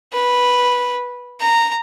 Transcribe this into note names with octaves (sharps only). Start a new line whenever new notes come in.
B4
A#5